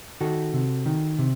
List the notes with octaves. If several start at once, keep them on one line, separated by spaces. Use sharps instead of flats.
D#3 F#4 A4
C3
D#3
C3